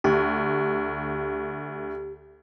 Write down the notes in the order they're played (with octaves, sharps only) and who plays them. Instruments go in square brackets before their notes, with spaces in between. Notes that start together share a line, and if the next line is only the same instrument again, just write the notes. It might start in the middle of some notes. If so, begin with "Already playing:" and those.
[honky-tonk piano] D2 [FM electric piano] G4